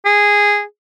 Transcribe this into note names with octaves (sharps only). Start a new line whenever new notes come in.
G#4